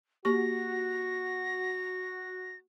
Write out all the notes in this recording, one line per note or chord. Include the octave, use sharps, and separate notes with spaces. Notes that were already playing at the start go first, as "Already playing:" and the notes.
A#3 F#4 G4 C#6 A#6